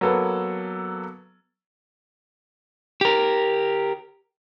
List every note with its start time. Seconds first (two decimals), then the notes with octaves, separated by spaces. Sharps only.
0.01 F#3 A#3 B3 A4
3.01 G4 A#4